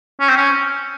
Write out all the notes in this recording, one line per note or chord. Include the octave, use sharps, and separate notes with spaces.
C#4
C4
C#4